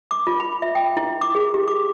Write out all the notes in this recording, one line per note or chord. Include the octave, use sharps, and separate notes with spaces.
D6
F4
B5
E5
G5
E4
D6
G#4
G4
D6